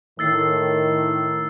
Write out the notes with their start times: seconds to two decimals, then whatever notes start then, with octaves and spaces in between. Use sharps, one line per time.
0.19 A2 D#3 E6 A6 C7